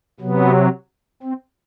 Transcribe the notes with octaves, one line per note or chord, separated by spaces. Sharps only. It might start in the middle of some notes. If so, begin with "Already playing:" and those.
C3 F#3 B3
C4